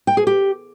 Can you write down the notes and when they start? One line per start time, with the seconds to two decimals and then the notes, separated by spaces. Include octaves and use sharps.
0.07 G5
0.17 G#4
0.27 G4